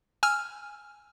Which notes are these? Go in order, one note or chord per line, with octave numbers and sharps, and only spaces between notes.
G#5 E6 F6